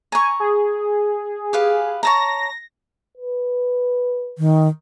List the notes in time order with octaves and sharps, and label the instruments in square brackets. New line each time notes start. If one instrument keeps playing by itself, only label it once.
[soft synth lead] G#5 [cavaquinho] A#5 C#6
[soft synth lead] G#4
[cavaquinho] G4 B4 F5
[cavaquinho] C#5 A5 A#5 [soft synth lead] A#6
[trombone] B4
[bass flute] D#3